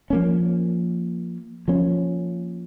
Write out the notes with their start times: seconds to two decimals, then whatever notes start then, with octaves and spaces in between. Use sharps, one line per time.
0.10 F3 A#3 C#4
1.68 F3 A#3 C#4